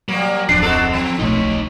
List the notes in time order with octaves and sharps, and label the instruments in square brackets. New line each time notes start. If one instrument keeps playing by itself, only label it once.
[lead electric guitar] F#3 [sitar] G3 A#3
[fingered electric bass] D1 F2 [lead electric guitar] F3 [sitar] D4 [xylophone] C7
[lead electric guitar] C4 [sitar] D#4 F#4 A4
[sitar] F3
[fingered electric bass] D1 B1 A3 [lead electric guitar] D#4 C#5